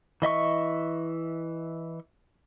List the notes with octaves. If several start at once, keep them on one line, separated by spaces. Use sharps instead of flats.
E3 D#5 E5 C#6